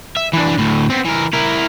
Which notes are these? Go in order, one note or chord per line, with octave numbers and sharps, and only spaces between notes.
E5
E3 D4
D2 A2
B3 C4
E3 A#4
E4 A#4